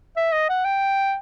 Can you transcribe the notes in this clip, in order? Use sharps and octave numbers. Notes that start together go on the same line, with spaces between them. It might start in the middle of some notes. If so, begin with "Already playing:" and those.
E5
D#5
F#5
G5